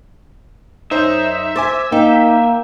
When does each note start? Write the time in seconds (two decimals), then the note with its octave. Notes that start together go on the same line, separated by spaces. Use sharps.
0.91 F#2 D#4 C5 E5
1.56 C5 G#5 D6 A6
1.92 A#3 D#4 G5